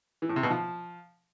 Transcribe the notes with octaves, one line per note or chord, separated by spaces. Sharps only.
E3
A2
C3
B2
F3